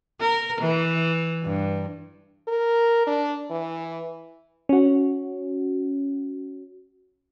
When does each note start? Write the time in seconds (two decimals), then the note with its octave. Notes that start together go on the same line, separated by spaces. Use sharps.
0.20 A#4
0.61 E3
1.43 G2
2.48 A#4
3.07 D4
3.51 E3
4.69 C#4 F#4